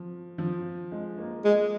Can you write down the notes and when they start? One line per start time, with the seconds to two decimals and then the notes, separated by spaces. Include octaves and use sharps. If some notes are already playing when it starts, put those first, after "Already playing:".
Already playing: F3
0.38 F3
0.92 G#3
1.18 A#3
1.45 G#3